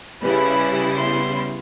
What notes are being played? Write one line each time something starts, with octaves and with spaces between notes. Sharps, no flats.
C#3 G3 E4 G#4 B4
B3 C6